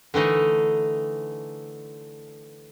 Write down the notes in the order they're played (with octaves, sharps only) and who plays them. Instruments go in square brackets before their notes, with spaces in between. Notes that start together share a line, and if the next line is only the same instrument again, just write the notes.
[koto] D3 E3 A3 D#4